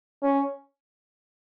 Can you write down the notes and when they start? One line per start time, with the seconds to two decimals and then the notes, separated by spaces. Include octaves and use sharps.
0.23 C#4